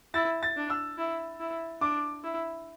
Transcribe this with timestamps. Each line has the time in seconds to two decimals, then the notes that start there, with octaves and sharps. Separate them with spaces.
0.14 E4 A6
0.43 A6
0.56 D4
0.70 E6
0.98 E4
1.40 E4
1.81 D4 D6
2.24 E4